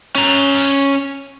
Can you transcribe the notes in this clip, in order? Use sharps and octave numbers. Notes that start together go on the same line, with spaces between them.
C#4 A#5